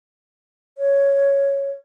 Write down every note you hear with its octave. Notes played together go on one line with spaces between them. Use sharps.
C#5